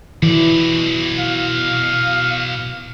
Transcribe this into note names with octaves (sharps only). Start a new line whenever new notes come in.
B2 E3 D5
F5